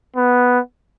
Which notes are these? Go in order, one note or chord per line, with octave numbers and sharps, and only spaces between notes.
B3